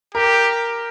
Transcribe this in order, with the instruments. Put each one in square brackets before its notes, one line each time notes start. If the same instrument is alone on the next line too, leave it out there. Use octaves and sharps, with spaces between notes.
[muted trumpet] G4 [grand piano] A#4